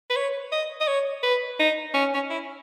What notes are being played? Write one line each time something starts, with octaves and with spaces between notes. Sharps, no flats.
B4
C#5
D#5
D#5
C#5
B4
D#4
C#4
C#4
E4